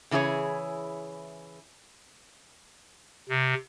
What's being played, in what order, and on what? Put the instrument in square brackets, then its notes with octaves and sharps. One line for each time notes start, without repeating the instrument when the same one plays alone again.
[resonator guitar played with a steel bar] C#3 E3 E4 G#4 C#5
[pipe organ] C3